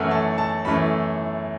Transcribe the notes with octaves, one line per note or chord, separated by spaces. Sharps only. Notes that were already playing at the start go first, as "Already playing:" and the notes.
Already playing: F#2 E3 A3 E4 F#5
A5
A5
F#2 E3 A3 E4 B5